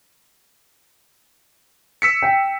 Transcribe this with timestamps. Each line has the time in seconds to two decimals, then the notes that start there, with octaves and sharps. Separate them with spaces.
2.02 E6 B6 C#7
2.22 G5